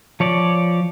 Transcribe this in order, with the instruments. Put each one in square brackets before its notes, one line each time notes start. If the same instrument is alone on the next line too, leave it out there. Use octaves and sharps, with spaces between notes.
[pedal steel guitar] F3 C#5 D5